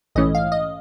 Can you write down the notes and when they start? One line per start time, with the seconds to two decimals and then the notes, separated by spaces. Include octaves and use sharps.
0.15 A#1 G#2 E3 A3 C#4 D#5
0.35 F5
0.52 D#5